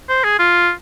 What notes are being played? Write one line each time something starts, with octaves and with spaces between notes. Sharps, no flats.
C5
G#4
F4